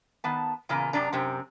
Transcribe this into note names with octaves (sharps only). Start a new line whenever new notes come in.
D#3 B3 A5
E2 A#2 C#3 A#3 G#5 A#5
F#2 C3 D4 A#5
F#2 C3 C4